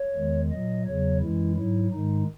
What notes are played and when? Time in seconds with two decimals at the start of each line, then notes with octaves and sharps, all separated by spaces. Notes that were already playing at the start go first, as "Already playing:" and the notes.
Already playing: C#5
0.16 E2 D#3 G#3
0.51 A#2 F#3 D#5
0.86 E2 C#3 F#3 C#5
1.22 F#2 E3 G#3 E4
1.56 G#2 F#3 E4
1.92 G#2 D#3 G#3 D#4